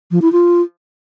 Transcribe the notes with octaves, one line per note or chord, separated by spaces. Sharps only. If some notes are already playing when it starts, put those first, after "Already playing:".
F3
E4
F4